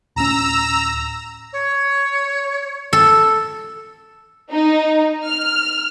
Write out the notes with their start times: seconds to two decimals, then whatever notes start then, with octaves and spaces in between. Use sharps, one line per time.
0.16 D1 C#4 A#5 E6
1.53 C#5
2.93 A4
4.51 D#4
5.25 F6